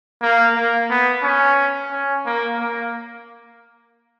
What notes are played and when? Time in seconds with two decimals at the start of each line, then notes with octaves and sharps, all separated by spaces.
0.22 A#3
0.55 A#3
0.90 B3
1.23 C#4
1.91 C#4
2.26 A#3
2.60 A#3